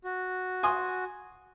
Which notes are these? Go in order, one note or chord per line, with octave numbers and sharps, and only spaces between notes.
F#4
G#5 C6 D#6